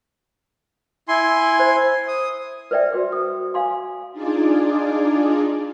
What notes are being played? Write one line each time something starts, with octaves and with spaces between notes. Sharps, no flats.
E4 G#5 C6
C5
D#6
B4 C5 D5 E5 G5
F#4 B4 D6
C5 D#6
F5 G#5 C6 D6
D4 D#4 F4 G#4 D5